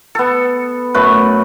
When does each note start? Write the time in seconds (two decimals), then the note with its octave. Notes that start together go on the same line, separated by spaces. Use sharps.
0.15 B3 A4
0.94 F#2 A3 B4